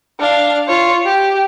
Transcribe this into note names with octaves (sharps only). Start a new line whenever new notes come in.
D4 F5
F4 C#5
G4